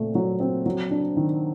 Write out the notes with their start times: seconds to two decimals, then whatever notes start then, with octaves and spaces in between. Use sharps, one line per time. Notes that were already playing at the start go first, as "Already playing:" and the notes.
Already playing: A#2 A3 C4
0.15 F#3
0.40 C4
0.66 F#3
0.91 D4
1.17 D#3